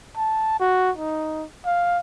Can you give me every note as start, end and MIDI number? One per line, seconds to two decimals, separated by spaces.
0.17 0.58 81
0.59 0.91 66
0.97 1.45 63
1.65 1.99 77